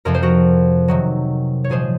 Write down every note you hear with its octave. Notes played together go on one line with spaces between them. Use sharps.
F2 C3 F3 A#4
C5
F#4 A#4
C3 D#3 F#3
C#5
A#2 F3 G#3 G#4 C5